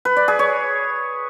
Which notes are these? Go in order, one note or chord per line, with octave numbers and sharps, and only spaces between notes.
B4
D5
G#4
C#5